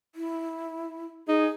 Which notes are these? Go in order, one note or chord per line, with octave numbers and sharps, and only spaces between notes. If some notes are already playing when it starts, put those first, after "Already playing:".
E4
D#4 G#4